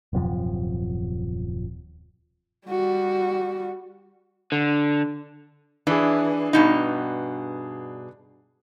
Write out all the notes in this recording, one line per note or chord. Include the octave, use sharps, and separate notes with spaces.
D#1 F#2 C3 F3
G3 F#4
D3
E3 D4 G#4
G2 B2 D#4